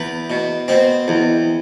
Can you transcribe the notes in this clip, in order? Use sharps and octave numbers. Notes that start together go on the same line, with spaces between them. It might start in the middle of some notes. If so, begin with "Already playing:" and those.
Already playing: E2 B4
B2
B2 C4
E2